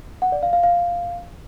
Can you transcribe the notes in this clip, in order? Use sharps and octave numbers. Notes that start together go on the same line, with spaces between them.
F#5
D5
F5
F5
F5